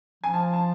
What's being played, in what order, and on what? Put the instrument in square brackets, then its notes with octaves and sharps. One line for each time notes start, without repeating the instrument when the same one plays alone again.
[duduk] F3 [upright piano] G#5
[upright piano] A5
A5